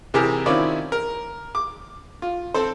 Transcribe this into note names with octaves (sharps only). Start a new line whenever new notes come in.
C3 E3 G4 G#4 A#4
D#3 C4 C#4 E4 F4 D5
A#4
D6
F4
C4 A4 C5